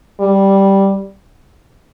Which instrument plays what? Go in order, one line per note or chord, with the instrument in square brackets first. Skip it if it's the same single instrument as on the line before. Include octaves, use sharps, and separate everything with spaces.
[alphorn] G3